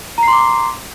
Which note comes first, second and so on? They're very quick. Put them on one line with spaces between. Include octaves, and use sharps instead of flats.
A#5 C7 C6 D6